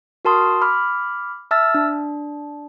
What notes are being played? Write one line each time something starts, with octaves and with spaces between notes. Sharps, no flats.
F#4 A#4 A5 C6 D#6
B5 D6 F6
E5 A5 E6 F6 A6
D4